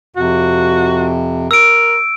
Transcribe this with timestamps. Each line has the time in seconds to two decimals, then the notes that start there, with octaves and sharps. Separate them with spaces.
0.16 F2 C3 F#4
1.51 A#4 E6 D7